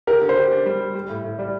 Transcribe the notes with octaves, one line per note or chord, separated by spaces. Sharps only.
G4 A#4
D3
C5
G4
D4
G3
G3
G3
A2
A2
G3 D5